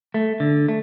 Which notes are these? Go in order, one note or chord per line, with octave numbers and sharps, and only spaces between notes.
A3
D3
A3